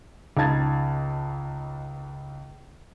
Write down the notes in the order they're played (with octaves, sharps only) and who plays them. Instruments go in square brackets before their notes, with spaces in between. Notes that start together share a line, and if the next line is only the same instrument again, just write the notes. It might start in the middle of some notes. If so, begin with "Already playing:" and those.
[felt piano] C#2 D#4 A5 G#6 A6